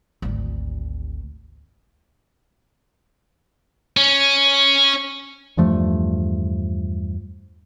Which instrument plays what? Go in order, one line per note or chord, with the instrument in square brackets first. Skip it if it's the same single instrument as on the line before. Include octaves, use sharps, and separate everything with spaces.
[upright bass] G#1 D2
[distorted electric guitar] C#4
[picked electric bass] E2 G2 F3 A3